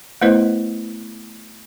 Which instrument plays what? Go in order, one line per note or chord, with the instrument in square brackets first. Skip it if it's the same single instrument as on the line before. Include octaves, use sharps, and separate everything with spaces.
[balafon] A3 B3 E4 B4 C5 D#5